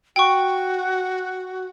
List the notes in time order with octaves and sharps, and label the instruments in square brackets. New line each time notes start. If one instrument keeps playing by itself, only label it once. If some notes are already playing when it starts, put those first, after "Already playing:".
[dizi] F#4 [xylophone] G5 C#6